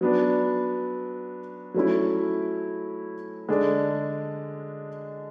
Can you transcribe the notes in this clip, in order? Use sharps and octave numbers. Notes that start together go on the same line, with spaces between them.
F#3 B3 D4
F#3 A3 C#4 E4
D3 G#3 D4